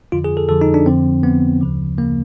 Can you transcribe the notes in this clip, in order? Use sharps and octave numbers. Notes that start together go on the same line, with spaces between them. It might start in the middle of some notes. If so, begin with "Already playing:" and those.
F2 D3 F3 F4
G#4
A4
F2 D3 F3 A4
D#4
D4
F2 D3 F3 C4
F2 D3 F3 B3
D2 C#3 F3
C#3 F3 A#3